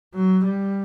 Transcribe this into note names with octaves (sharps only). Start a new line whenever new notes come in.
F#3
G3